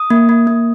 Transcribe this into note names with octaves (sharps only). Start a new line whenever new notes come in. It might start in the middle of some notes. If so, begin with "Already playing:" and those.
Already playing: D#6
A#3
A#3
A#3